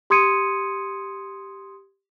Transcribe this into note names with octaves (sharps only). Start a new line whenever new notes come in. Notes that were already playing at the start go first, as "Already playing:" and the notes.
G4 C6 D#6 G#6 C#7 D#7